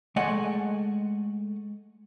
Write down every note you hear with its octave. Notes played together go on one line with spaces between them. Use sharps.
G#3 A3 D#5 F#5 G#5